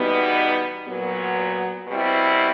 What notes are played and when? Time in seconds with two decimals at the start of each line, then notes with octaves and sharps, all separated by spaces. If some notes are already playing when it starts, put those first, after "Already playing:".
Already playing: E2 B2 G3 B3 D#4
0.86 A#2 F#3 B3
1.88 B2 G3 C4 E4